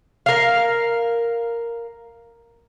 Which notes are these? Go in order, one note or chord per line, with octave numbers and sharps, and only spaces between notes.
A#4 F5